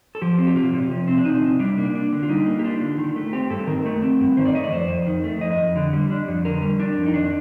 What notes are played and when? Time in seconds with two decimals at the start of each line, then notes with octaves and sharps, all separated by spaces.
0.15 A4
0.22 F3 G4
0.38 C4
0.47 G4
0.56 C3 F4
0.74 C3
0.91 F3
1.08 C4
1.18 D4
1.25 C3 D#4
1.43 C3
1.59 G3 D4
1.77 A#3 D4
1.95 D4
2.13 D3
2.23 F4
2.29 G3 D#4
2.46 A#3
2.59 G4
2.64 D4 F4
2.81 D3
2.98 D#3
3.16 A3
3.33 C4 G4
3.50 G2 A4
3.67 D#3 A#4
3.86 A3
4.02 C4
4.20 G2
4.37 D#3 C5
4.45 D5
4.55 A3 D#5
4.64 D5
4.72 F2 C5
4.89 F2
5.06 D#3
5.24 A3
5.41 F2 D#5
5.58 F2
5.76 D3
5.93 G3
6.10 D4
6.28 F2
6.45 D3 A#4
6.62 G3
6.80 D4
6.97 F2
7.06 D#4
7.14 D#3 D4